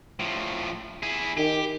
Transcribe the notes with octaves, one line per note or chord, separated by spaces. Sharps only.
A2 F3
E4 G#4
D#3 G4